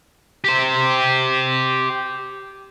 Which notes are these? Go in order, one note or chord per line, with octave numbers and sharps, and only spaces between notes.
G4 C5